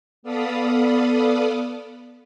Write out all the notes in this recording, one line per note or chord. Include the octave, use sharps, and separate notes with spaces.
B3 A4 D5 F5 B5 D#6